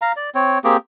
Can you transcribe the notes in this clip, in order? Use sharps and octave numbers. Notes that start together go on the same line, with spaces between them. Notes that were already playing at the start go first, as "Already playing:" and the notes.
F5 A#5
D5
C4 C#5
A#3 C4 G4 G#4